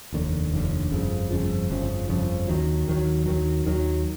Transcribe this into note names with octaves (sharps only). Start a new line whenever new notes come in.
F1 D#2 D3
F1 D#2 D3
G1 F2 C#3 F3
G1 F2 C#3 F3
G1 F2 C#3 F3
G1 F2 C#3 F3
D#2 D#3 F#3
D#2 D#3 F#3
D#2 D#3 F#3
D#2 D#3 F#3